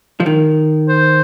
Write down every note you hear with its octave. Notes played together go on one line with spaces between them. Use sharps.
F3
D#3
C5